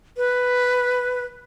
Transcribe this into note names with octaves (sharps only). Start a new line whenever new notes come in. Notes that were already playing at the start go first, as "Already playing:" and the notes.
B4